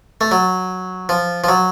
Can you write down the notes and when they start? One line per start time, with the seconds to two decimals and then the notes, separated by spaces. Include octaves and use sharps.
0.21 A3
0.31 F#3
1.09 F3
1.44 F3
1.49 F#3